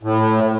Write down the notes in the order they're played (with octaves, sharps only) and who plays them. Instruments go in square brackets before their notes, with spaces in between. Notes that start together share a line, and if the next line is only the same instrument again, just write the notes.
[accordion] A2